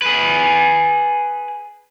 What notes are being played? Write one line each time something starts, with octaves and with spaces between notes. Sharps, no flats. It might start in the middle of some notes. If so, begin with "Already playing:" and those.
G#4 B4